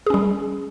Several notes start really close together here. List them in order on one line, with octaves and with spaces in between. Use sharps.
G#4 C#4 G3